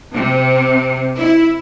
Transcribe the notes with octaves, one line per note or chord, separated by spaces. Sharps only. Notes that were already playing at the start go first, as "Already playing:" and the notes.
C3
E4